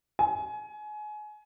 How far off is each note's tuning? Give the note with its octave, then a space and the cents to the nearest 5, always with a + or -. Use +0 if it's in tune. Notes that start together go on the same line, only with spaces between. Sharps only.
G#5 +25